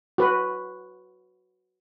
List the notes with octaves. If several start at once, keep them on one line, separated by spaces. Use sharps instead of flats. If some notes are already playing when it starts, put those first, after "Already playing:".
F#4 B4